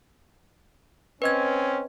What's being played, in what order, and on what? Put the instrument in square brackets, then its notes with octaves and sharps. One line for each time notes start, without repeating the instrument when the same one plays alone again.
[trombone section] C4 C#4 [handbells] B4 D#5 G#6